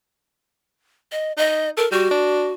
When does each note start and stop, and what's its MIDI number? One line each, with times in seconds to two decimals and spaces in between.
1.12 1.32 75
1.37 1.70 63
1.37 1.69 75
1.77 1.87 69
1.77 1.90 70
1.92 2.06 55
1.92 2.53 66
2.11 2.52 62